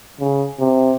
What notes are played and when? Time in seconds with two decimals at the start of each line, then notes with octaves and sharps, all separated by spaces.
0.20 C#3
0.59 C3